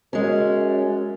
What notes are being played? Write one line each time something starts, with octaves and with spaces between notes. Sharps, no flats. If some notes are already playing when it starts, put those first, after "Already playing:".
F#2 G#3 C#4